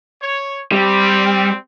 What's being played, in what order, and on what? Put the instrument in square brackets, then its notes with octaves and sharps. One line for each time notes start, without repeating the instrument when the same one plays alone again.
[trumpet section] C#5
[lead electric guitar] G3 [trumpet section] C4